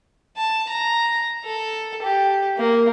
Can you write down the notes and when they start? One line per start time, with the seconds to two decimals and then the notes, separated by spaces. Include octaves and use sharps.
0.37 A5
0.69 A#5
1.45 A4
2.02 G4
2.57 A#3